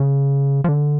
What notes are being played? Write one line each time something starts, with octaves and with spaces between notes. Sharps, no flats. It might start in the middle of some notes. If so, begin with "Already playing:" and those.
Already playing: C#3
F3
D3